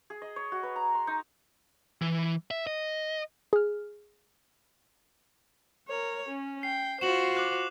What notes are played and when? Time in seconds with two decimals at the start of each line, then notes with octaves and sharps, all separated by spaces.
0.10 G#4
0.22 D#5
0.36 C#5
0.52 F#4
0.63 B4
0.76 A#5
0.95 C6
1.07 D#4
2.02 E3
2.51 E5
2.67 D#5
3.53 G#4 F6
5.89 A#4 C#5
6.29 C#4
6.63 G5 C7
7.01 F4 F#4 C5 E7 F#7
7.37 D6 F#6